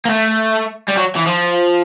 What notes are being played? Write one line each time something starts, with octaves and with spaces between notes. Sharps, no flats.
A#3
A3
G3
F#3
E3
F3